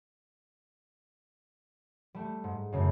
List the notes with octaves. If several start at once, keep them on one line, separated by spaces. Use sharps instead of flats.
G3 A3
G#2
F#2 C#3 A3